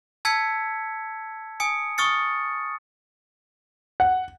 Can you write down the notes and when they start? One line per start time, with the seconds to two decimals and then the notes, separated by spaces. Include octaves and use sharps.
0.25 A5 E6 G#6 B6 C#7
1.60 G#5 D#6 C#7
1.98 C#6 D#6 F6 A6 C#7
4.00 F#5